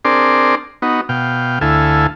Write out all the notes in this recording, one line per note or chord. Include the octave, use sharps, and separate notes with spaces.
C4 D4 G#4 A#4 D5 C6
B3 D#4 F#4
B2 F5 G5
D2 E4 A4 F5 G#5